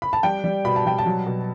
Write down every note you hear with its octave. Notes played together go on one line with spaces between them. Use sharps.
B5
A5
G3 G5
G3
B2 B5
A5
G3 G5
A5
F#3
B2